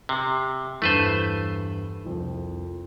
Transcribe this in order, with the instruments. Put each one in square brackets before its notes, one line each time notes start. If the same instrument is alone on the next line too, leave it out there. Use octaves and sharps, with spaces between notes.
[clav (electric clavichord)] C3 [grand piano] C7
[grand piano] E2 G2 B5 [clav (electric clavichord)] A3 B4 C5
[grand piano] C2 F2